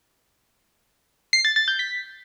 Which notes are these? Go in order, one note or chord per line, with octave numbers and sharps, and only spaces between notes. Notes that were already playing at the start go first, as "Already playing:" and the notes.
C7
A6
A6
G6
B6